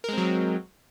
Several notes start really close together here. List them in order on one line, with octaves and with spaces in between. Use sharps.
A#4 G#3 C4 F#3